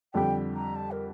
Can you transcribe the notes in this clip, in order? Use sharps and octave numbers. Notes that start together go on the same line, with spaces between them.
F2 D3 G3 D4 G4 G5
A#5
A5
A#4